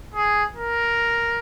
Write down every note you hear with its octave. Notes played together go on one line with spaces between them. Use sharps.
G#4
A#4